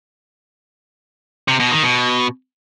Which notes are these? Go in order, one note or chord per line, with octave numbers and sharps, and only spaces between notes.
C3
B2
D#3
B2